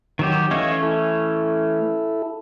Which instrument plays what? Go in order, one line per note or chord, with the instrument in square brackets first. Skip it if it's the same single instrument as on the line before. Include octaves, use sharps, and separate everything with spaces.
[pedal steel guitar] D#3 F#3 G4
[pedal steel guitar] E3 A3 C#4 [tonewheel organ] D#5 F5 C#6
[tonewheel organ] E4 A4